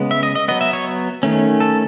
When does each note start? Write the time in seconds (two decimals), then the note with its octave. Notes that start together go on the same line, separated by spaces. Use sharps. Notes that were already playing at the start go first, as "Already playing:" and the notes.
Already playing: C#3 G#3 B3
0.11 E5
0.23 D#5
0.35 D#5
0.48 F#3 B3 D#5
0.61 E5
0.73 C#5
1.23 D#3 A3 C#4
1.60 A4